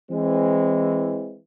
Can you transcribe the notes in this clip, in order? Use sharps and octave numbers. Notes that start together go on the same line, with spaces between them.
E3 G#3 C4